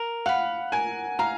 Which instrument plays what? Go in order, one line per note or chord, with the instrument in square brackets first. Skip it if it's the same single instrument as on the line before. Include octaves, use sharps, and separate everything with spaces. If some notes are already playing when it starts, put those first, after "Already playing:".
Already playing: [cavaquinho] A#4
[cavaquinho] F5 B5 [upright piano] F#5
[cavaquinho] A#4 [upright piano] G#5
[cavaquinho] F5 [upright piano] A#5